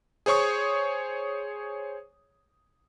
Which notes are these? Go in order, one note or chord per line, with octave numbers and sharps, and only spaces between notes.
G#4 C5 C#5 C#6 D#6